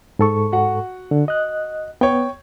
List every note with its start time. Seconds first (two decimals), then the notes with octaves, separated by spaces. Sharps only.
0.19 G#2 A4 C#6
0.52 F#4 F#5
1.11 D3
1.28 D#5 F#6
2.01 B3 C#5 G5